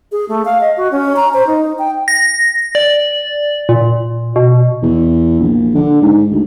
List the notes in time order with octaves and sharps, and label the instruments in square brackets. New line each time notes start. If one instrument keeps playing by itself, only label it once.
[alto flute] G#4
A3
F5
D#5
F#4
C#4
A#5
C5
D#4
G5
[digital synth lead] A#6
D5
A#2
B2
[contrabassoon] E2
A#1
D3
G#2
D2